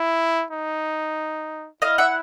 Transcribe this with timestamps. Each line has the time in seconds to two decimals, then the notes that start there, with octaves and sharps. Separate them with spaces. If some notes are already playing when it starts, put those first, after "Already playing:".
Already playing: E4
0.51 D#4
1.82 E4 D#5 F5
1.98 E5 F#5